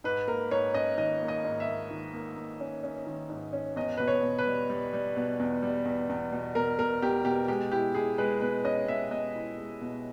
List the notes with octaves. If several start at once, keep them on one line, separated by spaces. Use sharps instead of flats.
G#2 B4
A#3 A#4
G#2 C#5
C#4 D#5
D#3 D#5
A#3
D#5
G#2
E5
A#3
D#3
A#3
A#3
C#4
C#4
D#3
G#2
C#4
E2 D#5
B2 B4
C#5
B2
B4
G3
G3
G3
B2
E2
G3
E2
E2
B2
B2 A#4
B2 A#4
E2 G4
B2 G4
G#3 G4
E4 G4
E4 G#4
G#3 B4
B2 B4
C#4 D#5
B2 E5
B2 D#5
E4
G#3
B2